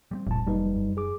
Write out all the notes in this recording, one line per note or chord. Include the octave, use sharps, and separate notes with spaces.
G3 A3 C4
F1 C#2 A#2 A5
F2 F#3 G3 A#3 D#4 B4
F#2
G#4 D6